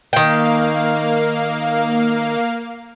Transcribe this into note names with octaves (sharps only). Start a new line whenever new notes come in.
D#3 A#3 F5 G5